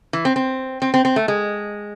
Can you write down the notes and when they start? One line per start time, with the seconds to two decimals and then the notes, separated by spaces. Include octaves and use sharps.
0.13 E3
0.25 C4
0.36 C4
0.82 C4
0.94 C4
1.05 C4
1.16 A3
1.28 G#3